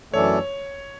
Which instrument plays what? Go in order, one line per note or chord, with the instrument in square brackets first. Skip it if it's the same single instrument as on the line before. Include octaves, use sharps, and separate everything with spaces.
[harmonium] F#2 E3 A3 D4 A4 [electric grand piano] C#5